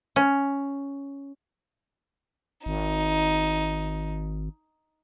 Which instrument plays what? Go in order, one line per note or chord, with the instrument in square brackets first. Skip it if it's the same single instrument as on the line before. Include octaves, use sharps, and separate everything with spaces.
[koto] C#4
[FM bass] G#1 [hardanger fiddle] D#4